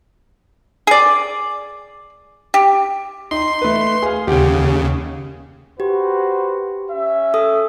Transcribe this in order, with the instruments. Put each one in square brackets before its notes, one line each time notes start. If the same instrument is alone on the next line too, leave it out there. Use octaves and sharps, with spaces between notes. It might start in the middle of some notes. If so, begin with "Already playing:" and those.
[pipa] G#4 D5
G4
[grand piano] D#4 [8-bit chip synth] C6
[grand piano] A3 B4
G#4 F5
[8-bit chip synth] D#2 C#3 [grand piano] G4 F#5 G5
[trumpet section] F#4 B4 C5 [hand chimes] G4
[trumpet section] C#4 E5
[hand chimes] A4 D#6